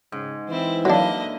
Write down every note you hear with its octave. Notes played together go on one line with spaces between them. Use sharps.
G#2 C#3
E3 C4 E4
D3 F#3 A#3 D4 E4 D#5